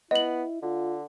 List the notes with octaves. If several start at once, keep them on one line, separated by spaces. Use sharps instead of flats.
B3 E4 D#5 F#7
D3 F4